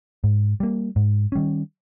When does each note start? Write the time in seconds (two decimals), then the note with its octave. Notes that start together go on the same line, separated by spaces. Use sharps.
0.24 G#2
0.60 G3 A#3
0.96 G#2
1.32 D#3 G3 C#4